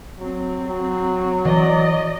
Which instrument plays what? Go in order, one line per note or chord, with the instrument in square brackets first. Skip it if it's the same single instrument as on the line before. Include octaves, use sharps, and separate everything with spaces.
[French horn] F#3 [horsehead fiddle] C4
[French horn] F#3
[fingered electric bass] E3 [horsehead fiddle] D5 D#5